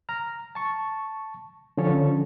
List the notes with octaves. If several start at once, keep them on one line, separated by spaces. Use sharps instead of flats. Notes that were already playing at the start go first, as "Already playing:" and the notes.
A#5 F6
A5 C#6
D3 F3 C#4 A4 C#5